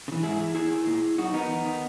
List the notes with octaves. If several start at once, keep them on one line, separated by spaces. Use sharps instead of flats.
C#3
E3
G#2 E4 G#4
E3
E2 E4 G#4
D#3
A#2
F#2 D#4 F#4
D#3 B3 D#4
E2
D#3